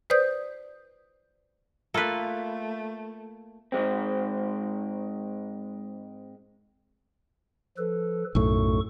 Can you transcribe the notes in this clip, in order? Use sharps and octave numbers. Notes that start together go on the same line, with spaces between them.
B4 C5 D5 D#6 G6
A3 A#3 F4 A4 B4
G#2 G#3 C4
F3 A4 B4
B1 F#2 A2 A4 C#6